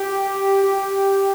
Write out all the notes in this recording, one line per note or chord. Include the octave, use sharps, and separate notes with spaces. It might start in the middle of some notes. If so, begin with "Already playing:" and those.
Already playing: G4
G4